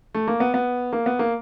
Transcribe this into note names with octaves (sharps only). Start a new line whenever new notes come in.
A3
A#3
B3
B3
A#3
B3
A#3